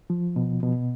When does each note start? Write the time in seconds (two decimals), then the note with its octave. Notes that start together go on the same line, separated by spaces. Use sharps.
0.10 F3
0.36 B2
0.63 B2